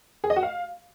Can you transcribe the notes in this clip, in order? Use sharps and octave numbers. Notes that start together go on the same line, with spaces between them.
G#4
D#5
F#4
F5